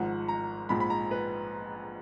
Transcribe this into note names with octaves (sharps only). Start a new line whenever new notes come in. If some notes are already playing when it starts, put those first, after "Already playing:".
Already playing: G#1 G#2 F3 F#5
A#5
A#1 G#2 F3 B5
B5
A#5
B4